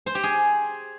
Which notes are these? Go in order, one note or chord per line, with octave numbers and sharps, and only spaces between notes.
C5
G4
G#4